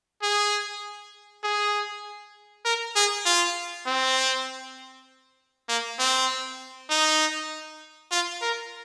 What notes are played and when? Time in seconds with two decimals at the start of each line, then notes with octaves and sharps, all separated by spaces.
0.23 G#4
1.44 G#4
2.65 A#4
2.96 G#4
3.26 F4
3.86 C4
5.69 A#3
5.99 C4
6.90 D#4
8.12 F4
8.42 A#4